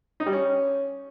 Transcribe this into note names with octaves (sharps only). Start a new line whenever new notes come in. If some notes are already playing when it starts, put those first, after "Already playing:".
D#4
G3
C#4